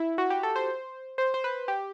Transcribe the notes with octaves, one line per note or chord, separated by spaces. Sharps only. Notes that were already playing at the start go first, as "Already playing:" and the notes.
Already playing: E4
F#4
G4
A4
C5
C5
C5
B4
G4